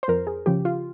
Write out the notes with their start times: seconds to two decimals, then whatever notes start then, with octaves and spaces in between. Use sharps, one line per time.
0.03 C5
0.08 F2 A#4
0.27 G#4
0.46 C#3 F3 G4
0.65 F4